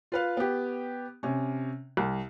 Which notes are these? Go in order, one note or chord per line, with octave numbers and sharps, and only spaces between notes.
F4 B4 F5
B3 G4
C3 C#4
C2